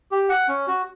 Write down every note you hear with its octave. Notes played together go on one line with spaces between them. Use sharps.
G4
F#5
C#4
F#4